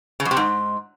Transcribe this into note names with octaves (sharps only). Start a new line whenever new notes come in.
C#3
F#2
C3
G#2